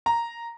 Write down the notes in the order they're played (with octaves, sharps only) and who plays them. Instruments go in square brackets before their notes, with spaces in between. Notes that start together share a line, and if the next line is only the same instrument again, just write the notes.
[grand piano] A#5